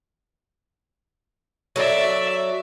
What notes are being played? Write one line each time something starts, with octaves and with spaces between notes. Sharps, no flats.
F#3 A4 D5 E5